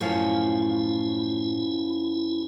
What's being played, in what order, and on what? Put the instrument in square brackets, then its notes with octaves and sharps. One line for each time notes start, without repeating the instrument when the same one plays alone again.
[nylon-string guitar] F#2 F3 C#4 [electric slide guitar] A2 F5 [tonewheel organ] E4